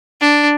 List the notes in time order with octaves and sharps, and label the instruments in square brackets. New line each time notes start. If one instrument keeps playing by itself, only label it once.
[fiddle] D4